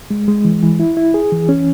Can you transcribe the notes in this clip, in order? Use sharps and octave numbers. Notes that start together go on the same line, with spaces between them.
G#3
G#3
E3
E3
E4
E4
G#4
E3
C#4